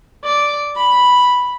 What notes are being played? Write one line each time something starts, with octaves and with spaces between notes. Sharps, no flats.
D5
B5